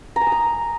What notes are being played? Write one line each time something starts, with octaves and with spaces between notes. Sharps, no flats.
A#5
G#5
D#6
A#5